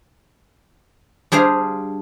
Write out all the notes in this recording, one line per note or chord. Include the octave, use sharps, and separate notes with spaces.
G3 D4 G#4 C5 F5